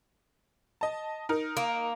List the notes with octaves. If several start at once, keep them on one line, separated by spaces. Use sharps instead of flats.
D#5 A5
D#4 A#4
A#3